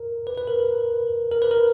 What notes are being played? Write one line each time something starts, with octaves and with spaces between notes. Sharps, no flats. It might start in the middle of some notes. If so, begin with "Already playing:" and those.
Already playing: A#4
B4
B4
A#4
A#4
A#4
B4
A#4